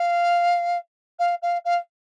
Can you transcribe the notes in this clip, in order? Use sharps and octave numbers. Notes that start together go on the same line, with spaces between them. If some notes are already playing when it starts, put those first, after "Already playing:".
Already playing: F5
F5
F5
F5